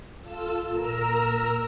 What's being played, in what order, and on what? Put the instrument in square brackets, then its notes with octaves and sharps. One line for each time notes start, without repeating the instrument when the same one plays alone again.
[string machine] F4 A4 E6
[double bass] A#2 [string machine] A#4 A#5 E6